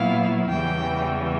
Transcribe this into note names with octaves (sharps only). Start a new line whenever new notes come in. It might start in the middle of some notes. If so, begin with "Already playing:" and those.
Already playing: A#2 F#3 B3 E4 F5
E2 C#3 E3 G3 G5